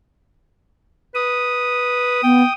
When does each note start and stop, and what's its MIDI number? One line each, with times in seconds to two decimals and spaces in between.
1.15 2.23 71
1.15 2.53 87
2.23 2.42 59
2.23 2.53 79